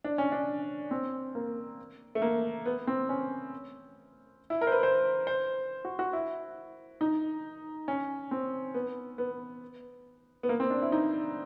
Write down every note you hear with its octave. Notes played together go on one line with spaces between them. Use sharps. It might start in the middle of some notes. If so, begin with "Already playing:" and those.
D4
C#4
D4
C4
A#3
A3
A#3
B3
C4
C#4
E4
A#4
C5
B4
C5
C5
F#4
F#4
E4
D#4
C#4
C4
B3
B3
B3
A#3
C4
D4
E4
D#4